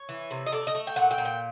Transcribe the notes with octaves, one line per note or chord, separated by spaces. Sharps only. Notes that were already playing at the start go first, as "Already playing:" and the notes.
Already playing: C#5
E3
C3
D#5
A3 D5
D#5
A3
G5
A#2 F#5
G5
A#2
G5